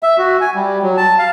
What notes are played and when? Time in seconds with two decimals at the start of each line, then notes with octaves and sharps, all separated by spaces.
0.03 E5
0.18 F#4
0.41 G#5
0.55 G3
0.82 F#3
0.97 A5
1.19 F5